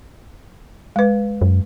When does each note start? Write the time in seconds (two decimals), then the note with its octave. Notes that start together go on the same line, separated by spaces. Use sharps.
0.96 G#3 B4
1.41 F#2